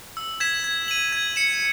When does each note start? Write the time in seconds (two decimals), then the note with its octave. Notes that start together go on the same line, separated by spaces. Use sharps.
0.17 E6
0.40 G#6 B6 E7
0.64 G#6
0.88 D#7 F#7
1.12 G#6
1.36 C#7 E7